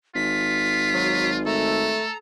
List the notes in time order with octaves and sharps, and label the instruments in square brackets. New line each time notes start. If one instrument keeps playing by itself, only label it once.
[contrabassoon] G#1 [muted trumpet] F4 [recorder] B6
[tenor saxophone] F#3
[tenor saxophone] A3 [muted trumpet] A4 [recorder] A#5